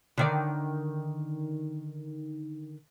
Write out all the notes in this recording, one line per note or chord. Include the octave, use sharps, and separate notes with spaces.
D3 D#3 D5